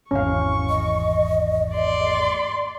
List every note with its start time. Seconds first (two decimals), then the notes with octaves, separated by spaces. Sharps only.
0.11 G#1 E2 E3 C#4 F5 C#6
0.69 D#5
1.74 D5 C6